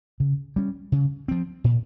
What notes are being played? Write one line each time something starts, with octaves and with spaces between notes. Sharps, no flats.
C#3
G3 C#4
C#3
F3 C4
A#2